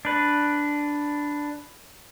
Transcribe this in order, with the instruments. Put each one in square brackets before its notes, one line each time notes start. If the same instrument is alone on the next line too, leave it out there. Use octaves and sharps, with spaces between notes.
[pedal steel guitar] D4 B4